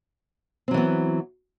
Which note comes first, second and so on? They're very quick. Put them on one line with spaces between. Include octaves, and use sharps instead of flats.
C4 F#3 E3 B3